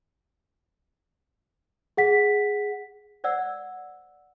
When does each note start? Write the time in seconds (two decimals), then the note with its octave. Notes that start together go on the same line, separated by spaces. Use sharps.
1.97 G#4 F#5 B6
3.24 C5 D5 F#5 E6